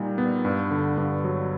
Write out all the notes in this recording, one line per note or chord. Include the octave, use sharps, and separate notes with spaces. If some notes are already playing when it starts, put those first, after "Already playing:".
Already playing: A#2 G3 D#4
B3
G2
D3
G2
F#3